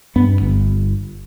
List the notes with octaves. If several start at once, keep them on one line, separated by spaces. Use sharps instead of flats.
G2 B3
G1